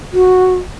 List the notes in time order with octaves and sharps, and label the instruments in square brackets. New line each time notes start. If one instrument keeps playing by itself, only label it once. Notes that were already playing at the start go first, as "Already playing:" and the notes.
[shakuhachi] F#4